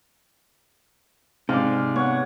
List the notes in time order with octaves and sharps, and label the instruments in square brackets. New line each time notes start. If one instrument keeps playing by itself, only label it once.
[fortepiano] G#2 [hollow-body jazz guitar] C3 [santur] D5 F5
[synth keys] B3 [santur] C#5 F#5